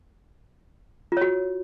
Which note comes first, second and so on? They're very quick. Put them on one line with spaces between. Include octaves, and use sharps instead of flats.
F4 C#5 F#4